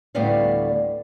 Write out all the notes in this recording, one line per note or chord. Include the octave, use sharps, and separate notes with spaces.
D2 A2 G3 B3 D5 F5